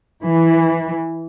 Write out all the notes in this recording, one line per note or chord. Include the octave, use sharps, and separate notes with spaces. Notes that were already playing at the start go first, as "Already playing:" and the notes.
E3